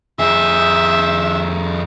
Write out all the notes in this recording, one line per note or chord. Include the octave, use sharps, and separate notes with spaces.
F2 G#4 E5